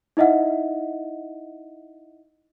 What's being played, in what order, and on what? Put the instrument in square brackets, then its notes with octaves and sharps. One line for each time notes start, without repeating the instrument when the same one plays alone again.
[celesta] D#4 E4 D#5 E5 F#5